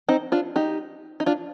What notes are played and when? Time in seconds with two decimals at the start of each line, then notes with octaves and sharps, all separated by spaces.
0.09 C4 D#4
0.32 D4 F4
0.56 D#4 G4
1.20 D#4
1.26 D4 F4